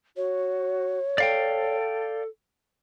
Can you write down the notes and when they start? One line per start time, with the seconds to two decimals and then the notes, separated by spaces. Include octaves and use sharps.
0.17 F#4 C#5
1.18 A4 D5 F5 G5